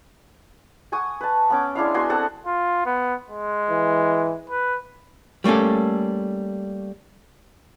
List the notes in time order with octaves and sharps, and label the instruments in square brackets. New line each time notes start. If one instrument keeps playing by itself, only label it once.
[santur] F#5 G#5 C#6 D#6
B4 A5
B3 C#4 D6
G#3 D4 E4 F5
B3 F#4 G#5 C6
C4 G#4 A4 F#5
[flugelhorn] F4
B3
G#3
[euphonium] E3
[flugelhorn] B4
[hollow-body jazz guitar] G3 A3 A#3 C#4 A4